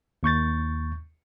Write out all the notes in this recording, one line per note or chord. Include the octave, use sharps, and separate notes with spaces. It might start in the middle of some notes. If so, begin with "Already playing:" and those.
D#2 C#6 G6 A6